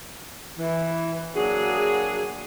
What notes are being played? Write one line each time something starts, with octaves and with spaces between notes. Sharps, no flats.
E3
F#3 A#3 D4 F#4 G#4